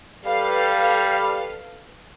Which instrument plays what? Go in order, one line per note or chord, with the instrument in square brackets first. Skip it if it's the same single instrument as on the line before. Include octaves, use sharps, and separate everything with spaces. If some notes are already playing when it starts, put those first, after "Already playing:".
[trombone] G3 [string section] A4 B4 F5